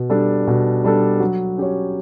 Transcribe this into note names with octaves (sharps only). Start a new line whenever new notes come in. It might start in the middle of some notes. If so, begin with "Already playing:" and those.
Already playing: B2
G3 D4 A4
B2
G3 D4 A4
F#3
C#4 G4 C#5